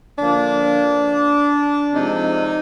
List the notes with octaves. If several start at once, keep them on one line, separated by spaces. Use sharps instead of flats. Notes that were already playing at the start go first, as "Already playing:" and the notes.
D3 F3 A#3 D4
C3 F3 G#3 D#4